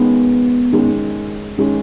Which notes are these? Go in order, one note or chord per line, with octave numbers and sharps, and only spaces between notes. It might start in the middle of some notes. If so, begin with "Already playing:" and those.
Already playing: D#3 G#3 B3 C#4
D#3 G#3 C#4
D#3 G#3 C#4